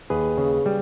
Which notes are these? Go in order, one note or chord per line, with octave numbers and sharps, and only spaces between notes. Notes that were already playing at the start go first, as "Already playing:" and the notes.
D#2 G#4 B4
C#3
G3